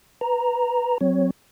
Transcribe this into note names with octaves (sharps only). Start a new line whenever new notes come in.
B4 A#5
F#3 C4 C#5